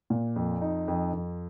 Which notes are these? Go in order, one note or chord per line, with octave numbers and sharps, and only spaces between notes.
A#2
F2
D#4
F2
F2